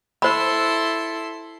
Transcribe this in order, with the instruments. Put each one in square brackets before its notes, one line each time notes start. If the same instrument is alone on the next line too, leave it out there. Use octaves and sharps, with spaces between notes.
[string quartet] E4 A4 C6 [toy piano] C5 B5